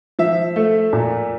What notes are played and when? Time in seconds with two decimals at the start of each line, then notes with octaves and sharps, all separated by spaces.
0.19 F3 E5
0.56 A3
0.93 A#2